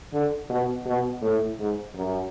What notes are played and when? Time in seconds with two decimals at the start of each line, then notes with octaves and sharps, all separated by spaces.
0.13 D3
0.49 B2
0.86 B2
1.22 A2
1.59 G#2
1.95 F#2